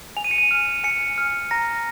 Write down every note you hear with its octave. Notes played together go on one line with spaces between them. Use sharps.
G#5 F7
D#7
C#7
D#7
F6
G#5 C#7
F6
A#5 A#6